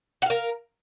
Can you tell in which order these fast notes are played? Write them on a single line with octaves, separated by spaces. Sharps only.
F#5 F5 A#4